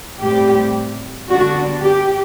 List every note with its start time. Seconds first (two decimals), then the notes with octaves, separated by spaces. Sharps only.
0.21 A2 G3 C4 G4
1.28 D3 G3 B3 D4 F#4
1.82 G4